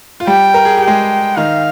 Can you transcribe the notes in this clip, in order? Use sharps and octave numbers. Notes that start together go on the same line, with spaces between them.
F4
G3 G4 G5
A#4
G#4
G4
G5
G#3 G#4
D#3 D#4 F5